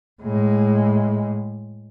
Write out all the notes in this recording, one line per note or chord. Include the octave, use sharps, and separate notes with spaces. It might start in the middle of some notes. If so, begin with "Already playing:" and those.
A2 G#3